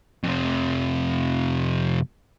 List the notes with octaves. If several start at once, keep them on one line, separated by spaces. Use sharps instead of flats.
F2 C3